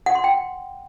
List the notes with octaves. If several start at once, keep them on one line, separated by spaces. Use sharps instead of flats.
F#5
C6
G5